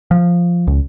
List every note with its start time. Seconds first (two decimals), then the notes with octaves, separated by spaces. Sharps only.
0.11 F3
0.67 C#2